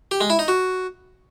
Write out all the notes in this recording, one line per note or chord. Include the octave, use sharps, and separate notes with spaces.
G4
G#3
E4
D#4
F#4